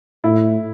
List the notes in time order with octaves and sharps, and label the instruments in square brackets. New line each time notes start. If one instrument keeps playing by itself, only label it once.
[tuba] A2 [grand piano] E4